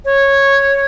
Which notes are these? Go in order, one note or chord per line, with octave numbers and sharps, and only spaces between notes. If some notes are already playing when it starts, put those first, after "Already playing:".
C#5